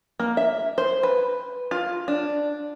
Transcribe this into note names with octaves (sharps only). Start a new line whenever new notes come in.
A#3
E5
C5
B4
F4
D4